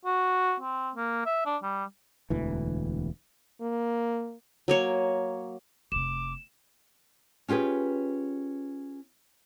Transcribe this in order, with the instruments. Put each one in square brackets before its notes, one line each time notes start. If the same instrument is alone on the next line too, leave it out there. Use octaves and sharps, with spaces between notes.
[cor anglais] F#4
C4
A#3
E5
D4
G3
[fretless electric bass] E1 D2 E3
[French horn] A#3
[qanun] F#3 A#3 C#5
[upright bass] F1 C3 [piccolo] D6 [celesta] E7
[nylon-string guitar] C#4 F4 G4 G#4 B4